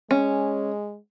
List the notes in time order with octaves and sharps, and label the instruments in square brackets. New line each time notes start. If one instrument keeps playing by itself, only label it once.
[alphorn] G#3 [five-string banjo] C#4